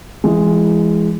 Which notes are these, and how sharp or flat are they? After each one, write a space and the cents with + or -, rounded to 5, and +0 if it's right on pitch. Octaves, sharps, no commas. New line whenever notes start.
E3 +35 G#3 +0